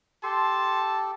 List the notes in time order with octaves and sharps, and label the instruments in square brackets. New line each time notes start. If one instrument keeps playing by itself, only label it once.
[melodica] G4 A4 [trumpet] A5 [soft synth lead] C6